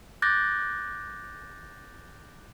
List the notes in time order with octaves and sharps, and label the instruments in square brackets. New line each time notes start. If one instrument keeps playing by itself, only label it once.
[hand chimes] D6 F#6 G6 A6 A#6